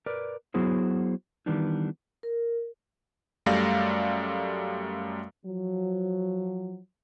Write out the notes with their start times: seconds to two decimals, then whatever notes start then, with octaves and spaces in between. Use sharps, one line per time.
0.06 A#4 B4 D5
0.54 F#3 B3 E4 F#4 G#4 C5
1.46 D#3 E3 G3 B3 D4 D#4
2.23 A#4
3.46 F#2 G3 A3 D5 F5 A#6
5.46 F3 F#3